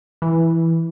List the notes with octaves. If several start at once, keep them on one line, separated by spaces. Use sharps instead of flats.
E3